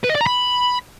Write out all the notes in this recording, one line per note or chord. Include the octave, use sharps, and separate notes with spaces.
B4
D#5
D5
A#5
B5